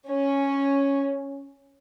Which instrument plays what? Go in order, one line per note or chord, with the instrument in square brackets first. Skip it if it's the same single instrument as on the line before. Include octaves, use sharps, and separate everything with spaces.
[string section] C#4